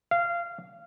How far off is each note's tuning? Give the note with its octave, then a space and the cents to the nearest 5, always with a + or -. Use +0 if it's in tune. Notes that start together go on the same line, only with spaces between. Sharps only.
F5 -20